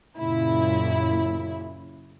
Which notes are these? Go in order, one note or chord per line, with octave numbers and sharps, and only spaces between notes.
F#2 A#2 C#3 E4